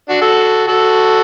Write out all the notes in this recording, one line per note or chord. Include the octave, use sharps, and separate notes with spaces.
D4 F#4
F#4 A4
F#4 A4